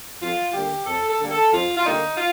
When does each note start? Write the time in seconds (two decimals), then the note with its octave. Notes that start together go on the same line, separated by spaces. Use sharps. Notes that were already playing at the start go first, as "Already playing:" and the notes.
0.21 F2 F4
0.54 D3 G3 A#3 G4
0.86 F2 A4
1.08 A4
1.19 D3 G3 A#3
1.30 A4
1.52 F2 F4
1.77 F4
1.84 D3 G3 A#3 D#4
2.17 F4